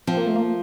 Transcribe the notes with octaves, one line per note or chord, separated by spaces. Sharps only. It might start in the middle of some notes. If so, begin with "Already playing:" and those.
F3 C4
A#3
A3
A#3